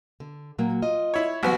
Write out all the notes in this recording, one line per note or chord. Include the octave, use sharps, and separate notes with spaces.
D3
A#2 F#3 A#3
F4 D#5
E4 C#5
C2 E3 F#3 B3 F#4